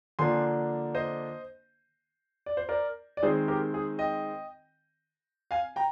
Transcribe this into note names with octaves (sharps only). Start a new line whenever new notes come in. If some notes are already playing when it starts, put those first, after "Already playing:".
D3 F3 A#3 D4 G#5 C6
C5 D#5
D5
C5
A#4 D5
D5
D#3 G#3 C4 G#4 C5
G4 A#4
G#4
D#5 G5
F5 G#5
G5 A#5